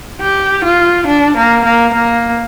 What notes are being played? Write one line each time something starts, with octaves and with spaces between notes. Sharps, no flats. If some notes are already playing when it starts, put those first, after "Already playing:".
G4
F4
D4
A#3
A#3
A#3